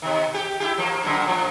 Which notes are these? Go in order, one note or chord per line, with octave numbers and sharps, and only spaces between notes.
B2 D#3
G4
E4 F4 G4
F3 A#3
F#2 A#2 D3
A2 F3